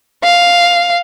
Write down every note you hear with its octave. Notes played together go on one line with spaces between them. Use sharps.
F5